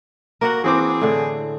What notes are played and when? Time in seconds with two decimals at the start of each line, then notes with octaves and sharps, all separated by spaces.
0.41 A#3 F#4 A#4 F#5
0.64 E3 C4 G#4 D6
1.01 A2 D3